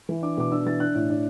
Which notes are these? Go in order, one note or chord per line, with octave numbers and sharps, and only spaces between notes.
E3
D4 D6
B2 D6
D4 E6
E3 A6
D4 F#6
A2
D4